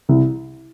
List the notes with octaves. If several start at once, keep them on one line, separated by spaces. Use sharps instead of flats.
C2